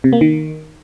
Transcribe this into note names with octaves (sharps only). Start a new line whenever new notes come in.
C3
A#3
D#3